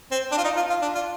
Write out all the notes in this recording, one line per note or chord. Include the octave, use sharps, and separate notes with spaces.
C4
D4
F4
D#4
F4
F4
D4
F4